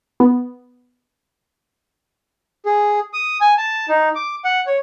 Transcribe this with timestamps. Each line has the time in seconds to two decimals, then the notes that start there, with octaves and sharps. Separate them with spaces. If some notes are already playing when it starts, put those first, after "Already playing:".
0.20 B3
2.65 G#4
3.13 D#6
3.41 G#5
3.58 A5
3.88 D#4
4.15 D6
4.45 F#5
4.66 C#5